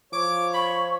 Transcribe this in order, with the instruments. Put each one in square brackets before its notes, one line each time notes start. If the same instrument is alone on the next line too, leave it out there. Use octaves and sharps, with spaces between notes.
[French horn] F3 [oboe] C#5 [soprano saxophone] D6
[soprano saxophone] B5 [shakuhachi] C#6